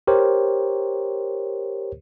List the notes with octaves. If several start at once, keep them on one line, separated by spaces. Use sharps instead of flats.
G4 A#4 C5 C#5